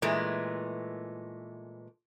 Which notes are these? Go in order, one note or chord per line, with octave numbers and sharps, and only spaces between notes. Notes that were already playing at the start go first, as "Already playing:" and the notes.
A#2 E3 G#3 A3